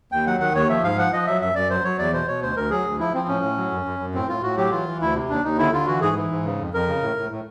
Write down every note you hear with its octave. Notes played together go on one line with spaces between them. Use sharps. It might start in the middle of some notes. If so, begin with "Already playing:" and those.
D#2 G5
F#3 F#5
D#3 F#5
D#2 C#5
F3 E5
G#2 F5
F3 F#5
F3 D#5
F#3 E5
F#2 E5
F#2 D5
F#3 C5
F#3 C#5
E2 D5
B2 C5
B2 C#5
D2 C5
D2 A#4
F#3 G#4
D2
F3 E4
F3 C4
A2 C#4
A2
F#3
F#2
F#2
F#2
A2 C4
A2 F4
A2 F#4
F#3 G4
E3 F4
E3
D2 E4
C3
D#2 D4
D#2 D#4
D3 E4
D3 F4
E3 F#4
G#2 G#4
E3
G#2
C#3
F2
F2 A#4
C#3
A2
A2
A2